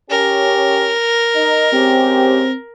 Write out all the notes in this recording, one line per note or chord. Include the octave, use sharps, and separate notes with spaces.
C#4 G4 A#4
D#4
G#2 C4 C#4 G4